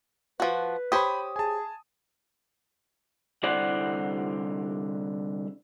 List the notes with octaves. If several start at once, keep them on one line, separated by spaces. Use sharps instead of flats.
F3 F#4 B4
G4 C5 C#5 B5 D#6
G#4 G#5 A5
C2 D3 E4 C5 D5 F#5